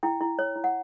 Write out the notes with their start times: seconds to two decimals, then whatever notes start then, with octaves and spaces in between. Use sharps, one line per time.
0.03 E4 G5
0.21 E4
0.39 C#5
0.56 E4
0.64 F#5